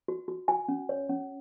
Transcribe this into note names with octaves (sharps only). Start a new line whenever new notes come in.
F#4
F#4
F#4 G#5
C#4
C#5
C#4